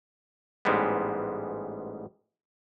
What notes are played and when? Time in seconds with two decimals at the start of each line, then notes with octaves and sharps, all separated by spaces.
0.65 A1 G#2 G3 G#3 B3